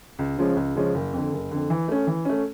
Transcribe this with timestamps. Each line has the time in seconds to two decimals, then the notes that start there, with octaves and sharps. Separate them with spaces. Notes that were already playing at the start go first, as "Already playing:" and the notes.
0.19 C#2
0.37 C#3 F3 G#3 C#4
0.56 C#2
0.76 C#3 F3 G#3 C#4
0.94 F#1
1.13 F2 D3
1.32 F#1
1.51 F2 D3
1.70 E3
1.88 A3 C#4
2.07 E3
2.25 A3 C#4